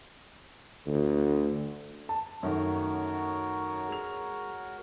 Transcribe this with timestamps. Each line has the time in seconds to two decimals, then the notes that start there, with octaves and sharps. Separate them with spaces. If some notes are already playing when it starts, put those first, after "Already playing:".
0.86 D2
2.09 A5
2.43 F#2 D#3 A3 F#4 A#4 C#5
3.89 G#3 F7